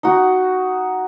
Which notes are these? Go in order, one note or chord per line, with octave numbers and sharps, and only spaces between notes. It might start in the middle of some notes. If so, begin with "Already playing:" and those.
D#4 F#4